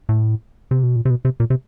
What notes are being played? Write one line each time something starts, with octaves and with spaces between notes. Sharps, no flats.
A2
C3
B2
A#2
C3
B2
C3
A#2
C3